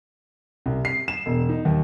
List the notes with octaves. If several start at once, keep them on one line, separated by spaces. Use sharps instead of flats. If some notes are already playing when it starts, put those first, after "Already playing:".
C2
C7
E7
E1
D#4
D#2